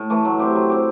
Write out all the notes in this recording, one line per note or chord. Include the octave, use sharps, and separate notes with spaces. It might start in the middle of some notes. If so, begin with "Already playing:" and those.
Already playing: A2
E3 A3
F#3
C4 G4
F#3
C4 G4